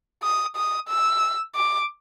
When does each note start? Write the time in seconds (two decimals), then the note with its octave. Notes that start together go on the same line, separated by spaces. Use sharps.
0.23 D#6
0.57 D#6
0.89 E6
1.56 D6